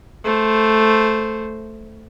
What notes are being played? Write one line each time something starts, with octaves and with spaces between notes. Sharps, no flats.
A3 C5